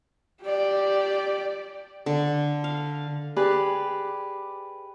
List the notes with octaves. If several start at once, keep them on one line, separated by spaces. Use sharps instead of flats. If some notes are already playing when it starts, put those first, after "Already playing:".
G4 D5
D3
F5
G4 G#4 B4 D5